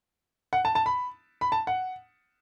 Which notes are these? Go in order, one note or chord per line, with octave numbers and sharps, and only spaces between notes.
F#5
A5
A5
B5
B5
A5
F#5